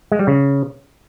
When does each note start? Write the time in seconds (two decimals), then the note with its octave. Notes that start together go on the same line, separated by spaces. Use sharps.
0.12 G#3
0.19 G3
0.27 C#3